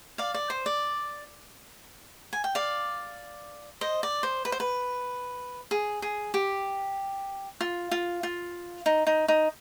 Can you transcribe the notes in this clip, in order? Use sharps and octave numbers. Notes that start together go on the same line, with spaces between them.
D5 F5
D5
C5
D5
G#5
G5
D5 F5
C5 D#5
D5
C5
B4
C5
B4
G#4
G#4
G4
F4
F4
F4
D#4
D#4
D#4